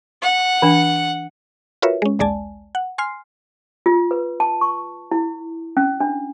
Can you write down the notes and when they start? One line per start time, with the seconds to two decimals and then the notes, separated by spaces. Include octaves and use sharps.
0.22 F#5
0.62 E3 D4
1.82 F4 F#4 A#4 B4 C#5 E5
2.02 G#3 C#4
2.19 A#1 D#2 G#3 D5 G#5 A5
2.75 F#5
2.98 G#5 C6 F6 C7
3.86 F4
4.11 B4
4.40 A5
4.61 C#6
5.11 E4
5.77 C#4
6.00 D4